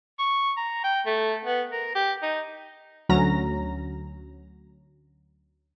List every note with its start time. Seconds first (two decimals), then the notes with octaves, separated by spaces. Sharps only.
0.19 C#6
0.57 A#5
0.84 G5
1.06 A3
1.45 B3
1.72 A#4
1.95 G4
2.22 D#4
3.09 D2 F#3 C#4 A#5 A#6